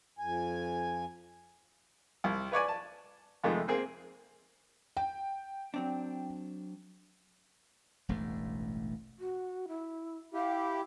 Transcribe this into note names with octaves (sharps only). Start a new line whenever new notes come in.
F2 G#5
C2
B4 C#5 D5 G#5
A5
F2 C3 D#3 G#3 A3
A#3 C4 G#4
G5
F#3 C4 D4
E1 A1 G2 A3
F#4
E4
E4 G4 F5